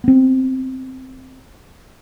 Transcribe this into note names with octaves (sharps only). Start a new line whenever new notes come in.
B3 C4